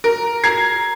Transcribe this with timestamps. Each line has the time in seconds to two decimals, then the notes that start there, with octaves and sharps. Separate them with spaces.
0.04 A#4
0.44 A#5 G#6 C7